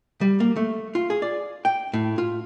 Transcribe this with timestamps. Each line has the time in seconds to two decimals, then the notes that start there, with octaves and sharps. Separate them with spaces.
0.21 G3
0.40 A#3
0.56 A3
0.95 F4
1.10 G#4
1.22 D5
1.65 G5
1.93 A2
2.18 F4